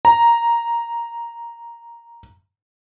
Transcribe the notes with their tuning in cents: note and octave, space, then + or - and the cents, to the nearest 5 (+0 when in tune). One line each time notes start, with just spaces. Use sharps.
A#5 +5